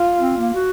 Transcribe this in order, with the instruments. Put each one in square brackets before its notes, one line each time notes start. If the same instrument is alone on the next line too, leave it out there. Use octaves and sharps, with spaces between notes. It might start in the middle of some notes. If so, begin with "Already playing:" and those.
Already playing: [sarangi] F4
[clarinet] C4
A#3
F#4